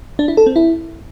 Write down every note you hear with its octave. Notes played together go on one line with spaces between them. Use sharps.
D4
E4
A4
C4
E4